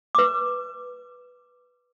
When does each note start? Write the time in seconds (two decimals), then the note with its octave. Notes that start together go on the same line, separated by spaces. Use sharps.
0.15 B4 D6